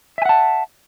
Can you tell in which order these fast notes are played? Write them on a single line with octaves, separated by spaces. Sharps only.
E5 G#5 F#5 A5